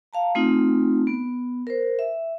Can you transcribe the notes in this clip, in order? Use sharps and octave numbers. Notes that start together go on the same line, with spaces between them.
F5 A5 A#5
A3 C4 D#4 F4
B3
A#4 C5
E5